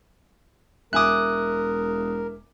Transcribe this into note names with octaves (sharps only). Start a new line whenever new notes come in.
E1 A#4 E5 G#5 D6 D#6 F#6